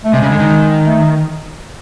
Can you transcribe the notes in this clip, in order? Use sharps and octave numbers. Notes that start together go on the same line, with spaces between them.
A3
C3 G#3
C#3
D3
D#3
A3